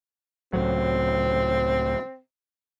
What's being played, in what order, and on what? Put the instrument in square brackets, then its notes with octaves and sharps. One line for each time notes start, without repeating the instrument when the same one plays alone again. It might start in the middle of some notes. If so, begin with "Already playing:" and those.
[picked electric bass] C#2 A2 F#3 [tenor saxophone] C4